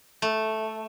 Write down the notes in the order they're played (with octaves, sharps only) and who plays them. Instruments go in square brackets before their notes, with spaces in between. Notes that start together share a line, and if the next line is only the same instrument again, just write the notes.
[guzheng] A3